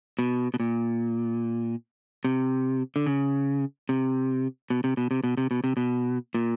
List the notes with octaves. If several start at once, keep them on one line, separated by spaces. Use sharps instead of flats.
B2
B2
A#2
C3
D3
C#3
C3
B2
C3
B2
C3
B2
C3
B2
C3
B2
A#2